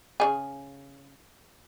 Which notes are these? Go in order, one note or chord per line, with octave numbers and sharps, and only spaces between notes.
C#3 G3 G#4